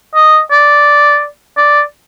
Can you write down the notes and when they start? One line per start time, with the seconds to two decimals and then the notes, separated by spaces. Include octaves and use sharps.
0.15 D#5
0.51 D5
1.57 D5